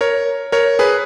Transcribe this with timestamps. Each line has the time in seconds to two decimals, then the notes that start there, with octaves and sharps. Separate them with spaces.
0.01 A#4 C#5
0.52 A#4 C#5
0.79 G#4 B4